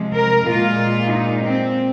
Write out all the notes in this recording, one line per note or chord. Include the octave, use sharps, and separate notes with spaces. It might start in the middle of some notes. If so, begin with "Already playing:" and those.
Already playing: C3 F3 G#3
A#4
A#2 G#3 F4
D#4
C4